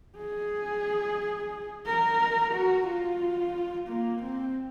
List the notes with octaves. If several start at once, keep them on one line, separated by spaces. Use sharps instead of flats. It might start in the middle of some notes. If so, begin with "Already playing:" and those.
G#4
A#4
F#4
F4
A#3
C4